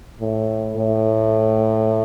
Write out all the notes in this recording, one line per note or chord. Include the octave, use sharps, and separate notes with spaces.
A2
A2